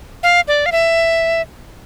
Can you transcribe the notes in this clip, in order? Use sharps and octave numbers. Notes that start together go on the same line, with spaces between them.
F5
D5
F5
E5